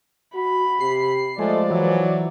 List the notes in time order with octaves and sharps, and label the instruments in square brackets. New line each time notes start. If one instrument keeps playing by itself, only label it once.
[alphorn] F#4 [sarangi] B5
[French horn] C3 [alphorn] G4 [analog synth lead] C7
[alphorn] F3 [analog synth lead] G#3 [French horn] A3 [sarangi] D5
[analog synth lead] E3 [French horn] F#3